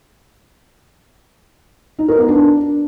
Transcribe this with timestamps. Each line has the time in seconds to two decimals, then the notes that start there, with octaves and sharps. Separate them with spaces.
1.99 D#4
2.08 A#4
2.18 B3
2.28 D4